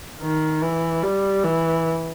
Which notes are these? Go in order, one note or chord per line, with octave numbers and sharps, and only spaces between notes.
D#3
E3
G3
E3